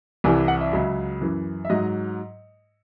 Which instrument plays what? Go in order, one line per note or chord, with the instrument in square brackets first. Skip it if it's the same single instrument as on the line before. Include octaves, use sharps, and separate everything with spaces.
[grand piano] C2 C3 E3 G#5
F#5
E5
C#2 C#3 F#3
F#2 E3
E5
G#2 F#3 D#5